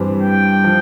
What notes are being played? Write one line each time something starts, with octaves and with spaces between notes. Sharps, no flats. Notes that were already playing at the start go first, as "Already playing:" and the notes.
Already playing: G2 E3 G3 C4
G5
F3